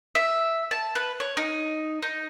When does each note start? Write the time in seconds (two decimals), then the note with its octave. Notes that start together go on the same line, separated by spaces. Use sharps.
0.15 E5
0.71 A5
0.95 B4
1.20 C#5
1.37 D#4
2.02 D#4